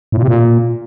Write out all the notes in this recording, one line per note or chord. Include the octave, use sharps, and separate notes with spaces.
A2
A#2
C3
A#2